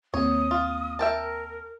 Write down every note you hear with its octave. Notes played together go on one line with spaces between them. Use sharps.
D#2 A#3 C4 C#5 D#6
F4
A#4 E5 G5 A5